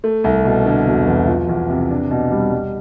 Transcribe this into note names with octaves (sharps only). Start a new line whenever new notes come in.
A3
C2
B2
D3
E1
E2
F3
E2
C3
D4
B2
G3
G3